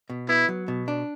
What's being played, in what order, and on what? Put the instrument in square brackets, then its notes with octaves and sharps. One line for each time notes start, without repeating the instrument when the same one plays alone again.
[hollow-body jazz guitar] B2
[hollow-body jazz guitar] B3 [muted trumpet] E4
[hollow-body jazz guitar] F#3
B2
D4